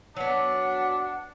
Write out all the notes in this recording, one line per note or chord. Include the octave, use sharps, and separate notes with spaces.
F#3 B3 D4 F#5